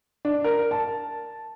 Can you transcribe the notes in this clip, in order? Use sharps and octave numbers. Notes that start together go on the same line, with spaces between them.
D4
A#4
A5